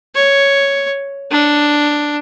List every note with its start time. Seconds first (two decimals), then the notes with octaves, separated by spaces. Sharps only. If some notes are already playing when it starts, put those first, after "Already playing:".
0.15 C#5
1.31 D4